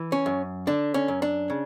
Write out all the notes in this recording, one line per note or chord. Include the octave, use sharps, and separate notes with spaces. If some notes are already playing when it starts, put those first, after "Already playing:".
Already playing: E3
C#4
F#2
D3 D4
C#4
F#2
D4
C#3